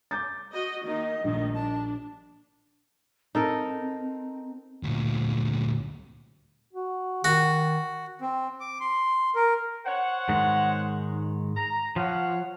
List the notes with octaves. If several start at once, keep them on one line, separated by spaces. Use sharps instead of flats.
D6 G6 A6
F#4 D#5
D#3 A#3 D#4 D#5
A#1 D#3 G3 A3
D4 A5
C4 D#4 A4 A#4
D2 A#2
F#4
D#3 F#4
C4
D6
C6
A#4
C5 C#5 F#5
G#2 D#3 G#3
A#5
F3 C#5 F5 F#5